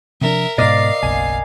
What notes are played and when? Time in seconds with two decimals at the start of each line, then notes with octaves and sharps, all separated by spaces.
0.21 C3 F3 D4 A#4 E5
0.58 G#2 B2 A#4 D5 D#5 F5 C7
1.03 F#1 B1 G#5